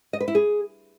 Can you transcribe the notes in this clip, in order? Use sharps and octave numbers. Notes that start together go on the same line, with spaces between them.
D#5
B4
E4
G#4